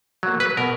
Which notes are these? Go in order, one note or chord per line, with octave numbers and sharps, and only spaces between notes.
F#3 A#3
B4
B2 A#4